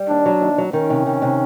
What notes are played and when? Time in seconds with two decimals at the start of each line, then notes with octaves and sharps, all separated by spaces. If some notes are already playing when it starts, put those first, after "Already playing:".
Already playing: G3
0.09 D#2 D4
0.26 F#3
0.41 D#2
0.58 F#3
0.73 D#3 C#4
0.90 C3
1.06 D#3
1.22 C3